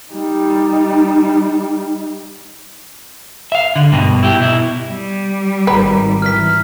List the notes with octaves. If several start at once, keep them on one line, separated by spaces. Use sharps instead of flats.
G3 D#4
E5 F5
D3
G2 B2
E4 G4
B2 E4
G3
G#1 D#3 B4 A#5
E3 F6 B6